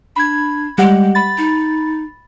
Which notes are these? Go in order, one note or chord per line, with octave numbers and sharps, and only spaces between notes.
D4 B5 G#6
G3 G#3 G4 F#5
B5 A6
D#4